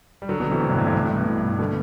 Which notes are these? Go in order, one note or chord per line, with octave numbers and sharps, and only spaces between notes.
G3
D3 F#3
B2 D3
C3 E3
A2 C3
G2
A2
G2 B2
A2
G2 B2
A2
A2
G2
A2
B2 D3